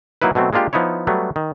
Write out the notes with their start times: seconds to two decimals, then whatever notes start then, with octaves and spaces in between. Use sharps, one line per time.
0.22 F#3 A#3 D#4 E4 B4
0.35 B2 F#3 A3 C4
0.53 G#3 A#3 D4 F4 G4
0.73 F3 B3 D#4 E4 C#5
1.07 F#3 G3 A3 B3
1.36 D#3